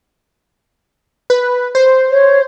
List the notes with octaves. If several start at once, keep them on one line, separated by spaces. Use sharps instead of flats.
B4
C5
C#5